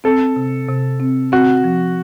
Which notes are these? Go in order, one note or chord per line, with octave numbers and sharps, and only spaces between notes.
C4 A4
C3
C3
C4
C4 F#4
F3